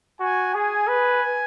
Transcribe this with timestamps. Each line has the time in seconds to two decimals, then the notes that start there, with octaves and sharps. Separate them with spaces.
0.20 F#4 G#5
0.54 G#4 G#5
0.88 B4